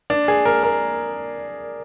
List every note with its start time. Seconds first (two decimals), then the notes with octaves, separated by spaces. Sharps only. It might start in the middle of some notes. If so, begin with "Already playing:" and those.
0.10 D4
0.28 G#4
0.45 A#4
0.63 A#4